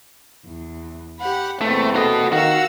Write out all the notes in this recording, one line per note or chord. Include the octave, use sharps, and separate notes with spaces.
E2
G4 F#5 B5
E2 C3 A3 A#3
F#4 A4 D#5
D#3 F#4 F5 E6